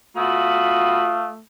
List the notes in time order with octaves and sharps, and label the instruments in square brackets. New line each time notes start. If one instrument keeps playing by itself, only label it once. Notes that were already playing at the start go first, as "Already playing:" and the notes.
[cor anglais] A3 [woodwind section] F4 D#6 [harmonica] F#4 B5 [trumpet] F5